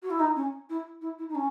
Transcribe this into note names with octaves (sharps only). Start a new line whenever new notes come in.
F#4
E4
D#4
C#4
E4
E4
E4
D#4
C#4